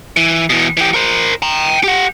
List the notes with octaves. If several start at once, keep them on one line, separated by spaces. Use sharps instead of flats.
E3
B2 E3
E3 G4
A#4 C5
G5 A#5
G4 F#5